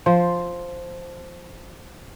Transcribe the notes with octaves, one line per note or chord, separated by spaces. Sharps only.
F3 C5